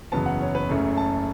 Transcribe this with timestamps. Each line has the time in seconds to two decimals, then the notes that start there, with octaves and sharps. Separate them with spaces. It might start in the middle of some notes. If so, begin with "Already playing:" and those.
0.12 F#1 E2 C#3 F#3 B3 A5
0.26 F#5
0.41 C#5
0.55 B4
0.69 F#1 F#2 C#3 A3 C#4
0.97 A5